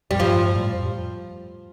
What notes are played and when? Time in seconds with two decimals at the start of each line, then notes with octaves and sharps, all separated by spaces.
0.11 F2 G3
0.20 G2 F3
0.56 A2
0.74 F2